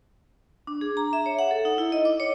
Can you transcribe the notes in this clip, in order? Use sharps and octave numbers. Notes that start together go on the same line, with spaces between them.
D4
G#4
A#5
E5
C#5
F#5
A4
D#4
E4
D#5
D6
C#5